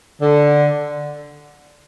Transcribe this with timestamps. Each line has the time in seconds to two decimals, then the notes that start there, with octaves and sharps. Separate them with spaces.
0.21 D3